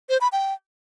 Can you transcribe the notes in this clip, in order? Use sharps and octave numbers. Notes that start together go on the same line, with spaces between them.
C5
B5
G5